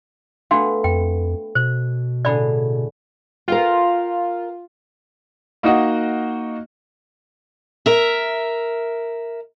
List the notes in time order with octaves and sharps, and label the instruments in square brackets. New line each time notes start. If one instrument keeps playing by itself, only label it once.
[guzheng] A3 B3 [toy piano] D4 F#4 F5
[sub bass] F2 [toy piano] G5
[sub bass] B2 [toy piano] C5
[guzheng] A2 D3 G#4 [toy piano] D5 B5
[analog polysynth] F4 [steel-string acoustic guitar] A#4 F5 G5
[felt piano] A#3 D#4 F#4 D#5 F#5
[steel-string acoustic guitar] A#4 E5